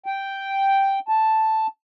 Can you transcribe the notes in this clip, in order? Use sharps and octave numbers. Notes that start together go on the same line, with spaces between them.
G5
A5